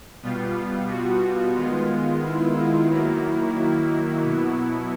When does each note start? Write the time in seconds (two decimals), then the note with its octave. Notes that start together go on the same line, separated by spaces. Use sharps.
0.23 B2 G3 B3 F4
0.90 F#4
1.56 D#3 G#3 B3 F4
2.22 E4
2.56 E4
2.89 D#3 F#3 A#3
3.56 E4
4.22 B2 F#3 B3